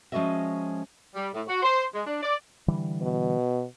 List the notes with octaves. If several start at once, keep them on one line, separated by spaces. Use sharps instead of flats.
F3 G#3 C#4 F#4 D#5 E5
G3
A2
F#4
C5
G#3
D4
D5
D3 E3 G3
B2